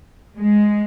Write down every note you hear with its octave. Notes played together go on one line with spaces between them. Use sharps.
G#3